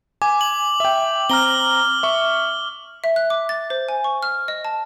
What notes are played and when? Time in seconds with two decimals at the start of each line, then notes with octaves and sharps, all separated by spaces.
0.22 G#5 D6
0.41 F#7
0.80 E5 G5
1.30 C4 A#5 F6 G7
2.03 E5 C#6
3.04 E5
3.16 F#6
3.30 D6
3.49 A6
3.70 C5
3.89 G#5
4.04 C#6
4.23 F6
4.48 D#5
4.65 A5